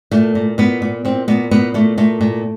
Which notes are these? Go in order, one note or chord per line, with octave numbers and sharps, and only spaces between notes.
A#2 A3
A#2
A#2 B3
A#2
A#2 C4
A#2 B3
A#2 B3
A#2 A3
A#2 A3
A#2